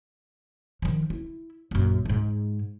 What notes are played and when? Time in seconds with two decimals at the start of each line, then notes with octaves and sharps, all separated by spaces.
0.82 D#3 F3
1.10 E4
1.71 A#1 F#2
2.05 G#2 G#3